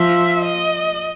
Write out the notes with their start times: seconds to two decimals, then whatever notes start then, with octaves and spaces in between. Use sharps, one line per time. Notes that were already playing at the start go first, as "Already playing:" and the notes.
Already playing: F3 E5
0.45 D#5